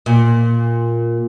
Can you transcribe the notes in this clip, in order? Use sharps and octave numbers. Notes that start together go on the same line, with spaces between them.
A#2